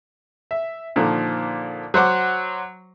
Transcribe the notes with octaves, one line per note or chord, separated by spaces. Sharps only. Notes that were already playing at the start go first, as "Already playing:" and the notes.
E5
A#2 D3 D#3 F3
F#3 C5 F#5 D6